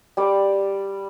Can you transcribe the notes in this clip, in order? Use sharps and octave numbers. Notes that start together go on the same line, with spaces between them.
G3 D5 G5 D6